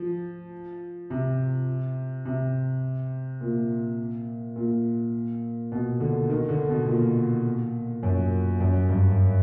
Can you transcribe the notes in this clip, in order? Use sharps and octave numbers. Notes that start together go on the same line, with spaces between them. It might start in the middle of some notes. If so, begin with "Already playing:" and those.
Already playing: F3
C3
C3
A#2
A#2
B2
D3
D#3
D3
B2
A#2
F#2
F#2
G2